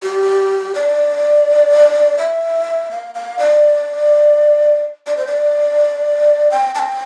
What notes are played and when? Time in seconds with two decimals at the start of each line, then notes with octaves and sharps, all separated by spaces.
0.03 G4
0.75 D5
2.18 E5
2.91 F5
3.15 F5
3.39 D5
5.07 D5
5.17 C5
5.27 D5
6.51 G5
6.75 A5
6.79 G5